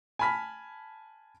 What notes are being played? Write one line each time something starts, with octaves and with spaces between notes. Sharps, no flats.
G#5 A5 B5 F6 B6